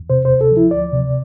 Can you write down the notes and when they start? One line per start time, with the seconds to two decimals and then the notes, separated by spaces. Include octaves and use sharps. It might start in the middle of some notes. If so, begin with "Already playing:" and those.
Already playing: E2
0.10 C3 C5
0.25 C5
0.30 D2
0.41 A4
0.51 F3
0.57 E4
0.71 D2 D5
0.92 C3